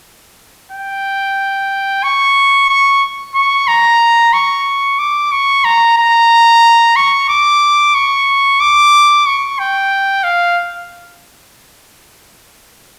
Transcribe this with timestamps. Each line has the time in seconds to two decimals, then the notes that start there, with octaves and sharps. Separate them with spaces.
0.71 G5
2.03 C#6
2.69 C#6
3.35 C#6
3.68 A#5
4.33 C#6
4.99 D6
5.32 C#6
5.64 A#5
5.97 A#5
6.96 C#6
7.29 D6
7.95 C#6
8.60 D6
9.26 C#6
9.59 G5
10.24 F5